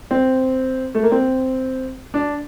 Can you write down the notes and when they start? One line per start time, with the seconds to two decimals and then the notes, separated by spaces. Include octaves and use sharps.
0.11 C4
0.95 A3
1.03 A#3
1.12 C4
2.14 D4